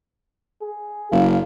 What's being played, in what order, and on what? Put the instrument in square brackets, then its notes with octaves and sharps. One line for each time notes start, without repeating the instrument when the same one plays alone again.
[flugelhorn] G#4
[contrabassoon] F#1 [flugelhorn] F5